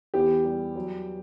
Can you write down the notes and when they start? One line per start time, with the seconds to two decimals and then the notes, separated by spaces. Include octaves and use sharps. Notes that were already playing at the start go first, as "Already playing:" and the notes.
0.14 E2 G4
0.45 G3
0.76 F#3